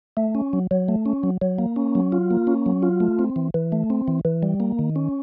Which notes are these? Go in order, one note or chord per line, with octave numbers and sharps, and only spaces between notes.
A3
C#4
F#3
F#3
A3
C#4
F#3
F#3
A#3
C#4
F#3
F4
A#3
C#4
F#3
F4
A3
C4
E3
E3
A3
C4
E3
E3
G3
A#3
D#3
C#4